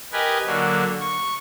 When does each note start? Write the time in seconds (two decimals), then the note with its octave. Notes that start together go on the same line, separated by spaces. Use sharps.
0.12 G4 A#4 B4 D#5 G#5
0.45 D3 F#3 A#3
1.00 C#6